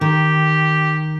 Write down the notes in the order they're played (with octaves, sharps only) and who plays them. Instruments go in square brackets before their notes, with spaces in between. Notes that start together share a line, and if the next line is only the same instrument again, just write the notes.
[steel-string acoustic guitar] D#3 [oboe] G4